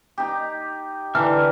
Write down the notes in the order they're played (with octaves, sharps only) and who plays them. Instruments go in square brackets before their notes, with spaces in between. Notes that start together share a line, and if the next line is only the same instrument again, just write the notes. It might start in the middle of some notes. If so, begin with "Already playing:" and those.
[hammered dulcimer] D#4 G4
[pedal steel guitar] D3 E5 F6 [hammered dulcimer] E3 D4 A#5